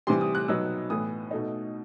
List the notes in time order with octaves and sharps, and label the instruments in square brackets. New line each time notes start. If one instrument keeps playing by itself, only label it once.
[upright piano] C3 E3 G3 C6
D#6
F#6
B2 F#3 B3 D#4 E6
A2 E3 B3 D#6
B2 A3 D#4